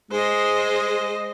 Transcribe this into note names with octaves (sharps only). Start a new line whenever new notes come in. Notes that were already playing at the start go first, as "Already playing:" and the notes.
G#3 C5 D#5